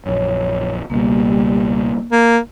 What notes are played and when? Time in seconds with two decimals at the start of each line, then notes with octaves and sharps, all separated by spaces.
0.06 A#1 F#2 C#5
0.90 C#2 B2 G3 A#3
2.12 A#3